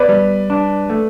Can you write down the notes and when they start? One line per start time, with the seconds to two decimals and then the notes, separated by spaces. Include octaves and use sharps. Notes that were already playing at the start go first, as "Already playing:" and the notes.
Already playing: B3 B4 D5
0.09 G3
0.50 D4
0.90 A3